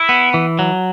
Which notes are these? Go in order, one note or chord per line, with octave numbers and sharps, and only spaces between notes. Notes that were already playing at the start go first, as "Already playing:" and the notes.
Already playing: E4
B3
E3
F#3